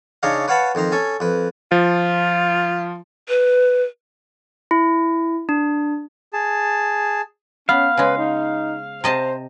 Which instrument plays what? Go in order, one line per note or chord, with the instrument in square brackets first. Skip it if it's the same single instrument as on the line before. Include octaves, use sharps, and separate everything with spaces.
[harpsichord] C#3 D4 D#4 C#5 D#5 F5
B4 C#5 F5 F#5 A5 B5
F2 D#3 C5 A#5
C#4 A4 G#5
F2 B4
[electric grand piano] F3 [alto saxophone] F4
[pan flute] B4
[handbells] E4
D4
[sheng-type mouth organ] G#4 A5
[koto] B3 [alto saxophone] C#4 [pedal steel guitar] F5
[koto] C#3 G#3 [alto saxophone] B4
[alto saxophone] D#4
[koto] C3 D#5 A5 [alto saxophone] C5